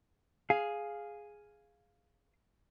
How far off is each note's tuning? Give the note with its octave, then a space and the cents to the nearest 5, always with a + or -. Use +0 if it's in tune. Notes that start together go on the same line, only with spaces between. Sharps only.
G#4 +0 F5 +0